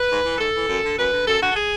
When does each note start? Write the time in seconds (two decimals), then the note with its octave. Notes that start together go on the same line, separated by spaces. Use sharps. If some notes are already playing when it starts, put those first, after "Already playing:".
Already playing: B4
0.09 G#2
0.24 E3
0.38 G#2 A4
0.53 E3
0.68 F#2
0.83 D3
0.97 F#2 B4
1.11 D3
1.26 F#2 A4
1.40 D3 F#4
1.51 A4
1.56 G#4